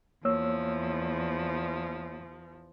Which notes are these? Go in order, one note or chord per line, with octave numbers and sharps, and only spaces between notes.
E2 F3 A#3 C#5 E6